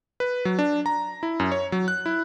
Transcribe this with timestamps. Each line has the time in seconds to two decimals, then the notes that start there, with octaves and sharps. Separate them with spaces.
0.20 B4
0.45 F#3
0.59 D4
0.86 A#5
1.23 E4
1.40 F#2
1.52 C#5
1.72 F#3
1.88 F#6
2.06 E4